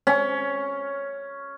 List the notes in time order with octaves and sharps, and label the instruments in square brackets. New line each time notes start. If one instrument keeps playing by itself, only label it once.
[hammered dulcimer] C#4